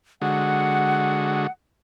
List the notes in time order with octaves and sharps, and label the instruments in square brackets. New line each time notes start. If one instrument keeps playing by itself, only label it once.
[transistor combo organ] D3 G#3 F#4 [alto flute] F#5